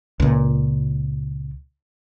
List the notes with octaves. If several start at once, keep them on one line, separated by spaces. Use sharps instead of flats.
C#2 A#2